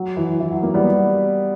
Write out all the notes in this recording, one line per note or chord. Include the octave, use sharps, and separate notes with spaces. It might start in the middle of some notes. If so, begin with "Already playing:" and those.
Already playing: F#3
E3
E3
F#3
F#3 A#3
G3 B3